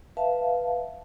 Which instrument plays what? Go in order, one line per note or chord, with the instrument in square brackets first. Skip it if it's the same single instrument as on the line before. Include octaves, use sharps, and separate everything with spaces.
[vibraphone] B4 E5 F5 A5